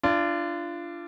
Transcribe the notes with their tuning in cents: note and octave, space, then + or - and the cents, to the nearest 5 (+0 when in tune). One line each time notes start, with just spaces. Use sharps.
D4 +0 F4 -30